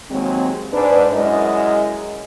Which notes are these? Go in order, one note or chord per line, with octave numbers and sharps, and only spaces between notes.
D#2 F#3 G#3 C4
G#2 D4 B4
F#2 G#3 E4 G#4 A#4 D#5